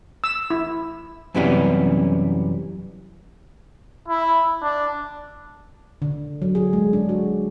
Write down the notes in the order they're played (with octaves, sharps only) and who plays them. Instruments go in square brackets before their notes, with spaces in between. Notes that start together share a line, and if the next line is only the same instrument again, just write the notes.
[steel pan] E6
E4
[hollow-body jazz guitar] F#2 C3 E3 G3 B3 C#4
[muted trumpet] E4
D4
[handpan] D3
F#3
G#4
G#3
D4
F#4